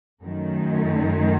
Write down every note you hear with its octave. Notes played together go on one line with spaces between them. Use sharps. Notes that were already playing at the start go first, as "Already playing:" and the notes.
F#2 D#3 A3